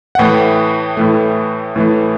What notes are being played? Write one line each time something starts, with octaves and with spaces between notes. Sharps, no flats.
F#5
A2 E3 A3 G5
A2 E3 A3
A2 E3 A3